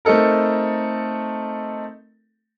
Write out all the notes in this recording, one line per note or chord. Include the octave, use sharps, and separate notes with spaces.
A3 C4 D#4 A4 A#4